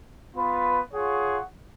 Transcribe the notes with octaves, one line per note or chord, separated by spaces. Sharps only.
B3 F4 B4
F4 G#4 C#5 F#5